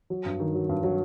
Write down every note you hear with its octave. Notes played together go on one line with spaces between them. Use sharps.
F#3
G2
D#3
F#3
G2
F#3